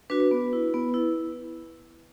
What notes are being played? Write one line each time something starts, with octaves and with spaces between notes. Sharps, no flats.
D4 F#4 B4
B4
B3
E4
B3
E4